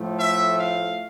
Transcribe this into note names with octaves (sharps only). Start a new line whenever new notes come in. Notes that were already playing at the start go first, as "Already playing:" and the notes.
Already playing: A2 F3 A3
E5
F5